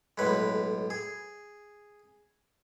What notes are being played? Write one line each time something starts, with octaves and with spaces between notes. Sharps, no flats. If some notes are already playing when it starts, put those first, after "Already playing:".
B1 A2 G#3 B4
G#4